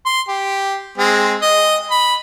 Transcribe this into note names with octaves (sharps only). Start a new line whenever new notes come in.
C6
G4
G#3 C4 G#4
D#5
B5